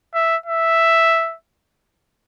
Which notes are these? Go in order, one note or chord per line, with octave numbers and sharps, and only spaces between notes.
E5
E5